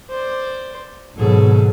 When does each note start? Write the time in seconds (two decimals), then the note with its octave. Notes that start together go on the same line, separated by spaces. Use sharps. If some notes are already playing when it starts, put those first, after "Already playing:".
0.10 C5 D5
1.18 G#1 B2 F#3 G#4 A4